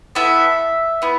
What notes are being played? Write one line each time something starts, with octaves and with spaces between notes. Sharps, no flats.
B3 E4 A4 E5
B3 E4